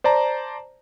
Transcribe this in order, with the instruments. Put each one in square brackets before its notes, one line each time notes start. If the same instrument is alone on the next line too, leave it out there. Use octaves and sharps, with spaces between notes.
[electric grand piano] C5 D5 A5 A#5